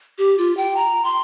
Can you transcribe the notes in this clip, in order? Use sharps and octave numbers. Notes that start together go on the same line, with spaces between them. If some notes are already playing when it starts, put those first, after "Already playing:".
G4
F4
G5
A#5
C6